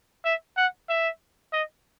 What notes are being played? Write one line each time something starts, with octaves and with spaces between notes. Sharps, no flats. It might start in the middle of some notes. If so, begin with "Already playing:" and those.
E5
F#5
E5
D#5